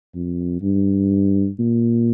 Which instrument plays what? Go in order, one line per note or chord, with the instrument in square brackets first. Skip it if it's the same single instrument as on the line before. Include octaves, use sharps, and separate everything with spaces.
[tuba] F2
G2
A#2